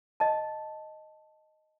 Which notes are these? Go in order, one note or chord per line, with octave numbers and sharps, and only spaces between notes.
D#5 A5